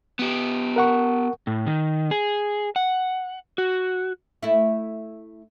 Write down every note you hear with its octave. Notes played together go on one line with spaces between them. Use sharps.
B3 G4
A#4 F#5 C#6
A2
D#3
G#4
F#5
F#4
A3 E4